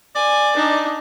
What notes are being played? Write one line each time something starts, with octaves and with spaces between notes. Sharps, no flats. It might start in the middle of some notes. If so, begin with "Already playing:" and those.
D5 G#5
D4 D#4